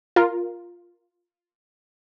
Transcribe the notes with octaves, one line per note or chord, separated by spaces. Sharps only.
F4 A#4